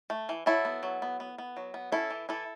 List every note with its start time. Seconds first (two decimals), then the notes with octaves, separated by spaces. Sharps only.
0.10 A3
0.29 E3
0.46 F#3 E4 A4
0.65 B3
0.83 F#3
1.02 B3
1.20 B3
1.38 B3
1.57 F#3
1.74 B3
1.92 C#4 E4 A4
2.10 E3
2.29 E3 E4 A4